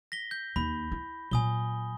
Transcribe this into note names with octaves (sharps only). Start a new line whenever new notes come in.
A#6 B6 G7
G6
D#2 B5
E4
A#2 F#3 G#5 D#6 G7